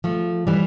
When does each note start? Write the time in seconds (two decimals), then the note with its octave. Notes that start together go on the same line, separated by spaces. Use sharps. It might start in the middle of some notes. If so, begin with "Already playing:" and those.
0.04 F3 A3
0.47 E3 G3